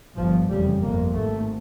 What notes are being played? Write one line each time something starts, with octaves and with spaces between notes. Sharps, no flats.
G1 G2 F3
F1 E2 C#3 G3
G1 F2 C3 A#3
G#1 G#2 A3